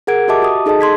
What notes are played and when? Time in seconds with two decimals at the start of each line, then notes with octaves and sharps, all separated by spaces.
0.07 G#4 A#4 F#5 G#6 D7
0.28 F#4 G4 D#5 E5 A5 D6
0.42 F#4 D#6
0.66 D#4 G#4 A4 D#5 A5
0.81 C6 G#6 B6